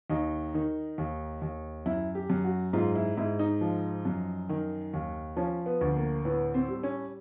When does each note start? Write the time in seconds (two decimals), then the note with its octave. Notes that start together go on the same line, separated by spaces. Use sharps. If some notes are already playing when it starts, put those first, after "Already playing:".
0.10 D#2 D#4
0.54 D#3
0.98 D#2
1.42 D#2
1.86 F#2 E4
2.15 G4
2.30 F#2
2.44 F#4
2.73 G#2 F4
2.95 E4
3.17 G#2 E4
3.39 D#4
3.61 F3
4.05 F#2
4.49 D#3
4.94 D#2
5.37 F3 C#4
5.66 B3
5.81 D2
5.96 A#3
6.25 A2 B3
6.54 C4
6.68 G3
6.83 C#4